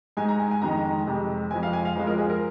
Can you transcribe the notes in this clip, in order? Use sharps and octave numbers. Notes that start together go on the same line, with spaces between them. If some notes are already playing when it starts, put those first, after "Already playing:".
G#2 G#3 G#5
A#5
G#5
G#5
F2 D#3 G#3 A#5
F2 C3 G#3
F2 F3 G#3 G#5
F5
G#5
F5
F2 F3 G#3
A#4
G#4
A#4